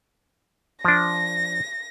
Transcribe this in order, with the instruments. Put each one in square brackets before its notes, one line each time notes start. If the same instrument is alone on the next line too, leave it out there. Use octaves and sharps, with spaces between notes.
[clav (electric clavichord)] F3 D4 [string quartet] A#6